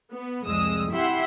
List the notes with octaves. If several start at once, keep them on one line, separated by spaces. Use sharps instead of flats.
B3
C2 F2 G#3 D#6 E6
E4 G4 E5 F#5 C6